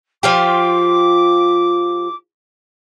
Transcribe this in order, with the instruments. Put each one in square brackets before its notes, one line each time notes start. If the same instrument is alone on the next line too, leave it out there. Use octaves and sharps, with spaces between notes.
[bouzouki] F3 F4 G4 [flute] D6